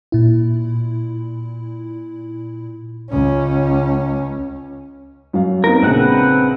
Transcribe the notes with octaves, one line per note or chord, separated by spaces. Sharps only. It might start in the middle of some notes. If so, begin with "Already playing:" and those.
A#2 E4
C#2 C#4
F#2 F#3 F5
B3 C4 D#4 A#4
A#1 C#3 C4 B4 F#5